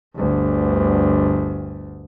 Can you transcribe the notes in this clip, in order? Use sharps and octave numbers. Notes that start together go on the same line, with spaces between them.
G1 D2